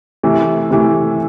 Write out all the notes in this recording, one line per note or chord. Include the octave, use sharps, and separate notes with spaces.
C3 E3 A3
C3 E3 A3